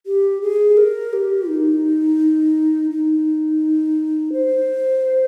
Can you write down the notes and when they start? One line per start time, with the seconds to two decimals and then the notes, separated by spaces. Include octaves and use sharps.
0.06 G4
0.42 G#4
0.77 A#4
1.13 G4
1.49 D#4
2.91 D#4
4.33 C5